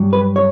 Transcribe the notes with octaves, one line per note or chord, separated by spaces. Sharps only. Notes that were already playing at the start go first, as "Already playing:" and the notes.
Already playing: G2 F#3
B4
C#5